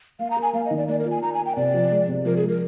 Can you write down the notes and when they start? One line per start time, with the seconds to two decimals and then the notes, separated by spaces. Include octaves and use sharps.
0.19 A#3 F5
0.30 A#5
0.37 A#4
0.42 G#5
0.53 A#3 F5
0.65 D#5
0.71 D#3
0.77 D5
0.88 A#3 D5
0.99 A#4
1.06 F4 G#5
1.22 A#3 A#5
1.34 G#5
1.40 A#4
1.45 G5
1.56 C3 D5
1.74 F3
1.91 G#3
2.08 C3
2.25 F3 A#4
2.36 G#4
2.42 G#3
2.48 A#4